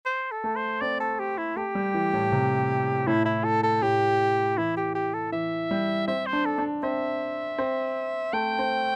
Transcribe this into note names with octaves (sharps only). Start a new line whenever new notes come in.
C5
A4
A3
C5
C4 D5
A4
G4
E4
A3 G4
G3
E3
A2
C3
A2 E4
E4
A4
A4
A2 G4
E3 E4
G4
G4
A4
E3 E5
G3
C4 E5
C5
D4
A4
D4
C4 E5
C4
A3 G5
C4